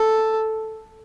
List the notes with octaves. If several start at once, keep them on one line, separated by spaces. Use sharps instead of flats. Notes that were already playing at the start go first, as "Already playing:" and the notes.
Already playing: A4